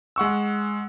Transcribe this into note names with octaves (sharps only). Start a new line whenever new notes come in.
G#3 F#5 C#6 E6